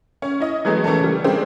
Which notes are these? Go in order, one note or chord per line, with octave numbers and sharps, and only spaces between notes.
C#4
E4 D#5
E3 F#3 G#3 A3 B3 E4
E3 A3 C#4 A4
C#3 G3
G#3 C4 D4